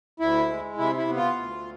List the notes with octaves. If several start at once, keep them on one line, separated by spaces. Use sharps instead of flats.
D2 E4
G#3
C3 E4
E4
B3
F4
D2